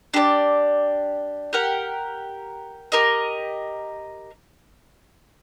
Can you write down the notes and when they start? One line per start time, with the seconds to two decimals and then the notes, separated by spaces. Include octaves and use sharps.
0.14 D4 G4 A#4 D5
1.53 G4 A#4 F#5
2.92 G4 A#4 D#5